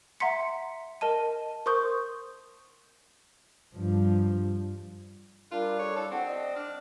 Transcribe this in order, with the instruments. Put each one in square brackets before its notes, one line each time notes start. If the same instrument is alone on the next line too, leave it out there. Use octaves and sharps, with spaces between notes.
[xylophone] E5 F#5 A#5 C6 B6 C#7
A#4 D#5 A5 D#7
A#4 C5 C6 C#6 D#6 G6
[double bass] G2 F3
[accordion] G3 D4 F#6 [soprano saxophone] F4 [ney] A#4
[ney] A4 [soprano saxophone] C#5
[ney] E4 [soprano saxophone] A4
[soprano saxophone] C4 [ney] F#5
[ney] D5 [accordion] D#5 D#6
[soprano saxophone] D4 [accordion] F6